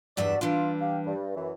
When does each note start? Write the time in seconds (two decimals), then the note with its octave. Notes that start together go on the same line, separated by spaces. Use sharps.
0.17 E2 G2 F#4 D5 E5
0.41 E3 G3 D4 F4
0.81 G4 F5
1.06 G2
1.35 F#2 E3